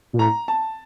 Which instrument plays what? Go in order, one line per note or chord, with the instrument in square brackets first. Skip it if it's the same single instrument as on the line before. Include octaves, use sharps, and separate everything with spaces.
[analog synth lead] A#2
[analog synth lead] A2 [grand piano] A#5
[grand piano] A5